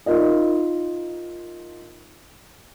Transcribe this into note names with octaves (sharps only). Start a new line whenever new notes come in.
D#4 F4 A#4 D#5